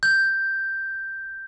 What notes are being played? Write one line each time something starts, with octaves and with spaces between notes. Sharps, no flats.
G6